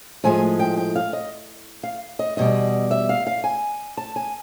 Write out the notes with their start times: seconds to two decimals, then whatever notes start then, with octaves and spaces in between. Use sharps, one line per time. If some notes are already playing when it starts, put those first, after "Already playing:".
0.24 A2 F3 G#3 G#5
0.59 G5
0.77 G5
0.96 F5
1.13 D#5
1.83 F5
2.19 D#5
2.37 E2 B2 G3 D#5
2.91 E5
3.09 F5
3.27 F5
3.44 G#5
3.97 A5
4.16 G#5